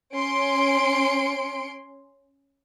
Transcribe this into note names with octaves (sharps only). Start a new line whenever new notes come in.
C#4 C6 D7